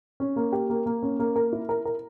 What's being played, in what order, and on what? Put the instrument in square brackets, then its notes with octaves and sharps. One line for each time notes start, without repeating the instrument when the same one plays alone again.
[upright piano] C#4
A#3
G4
A#3
A#3
C#4
A#3
A#4
E4
A#4
A#4